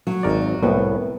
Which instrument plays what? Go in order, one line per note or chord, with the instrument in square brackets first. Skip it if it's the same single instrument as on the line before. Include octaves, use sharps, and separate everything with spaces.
[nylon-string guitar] F#3
[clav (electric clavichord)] G#1 A#4 D5
[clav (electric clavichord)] C2 A2 [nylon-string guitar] B3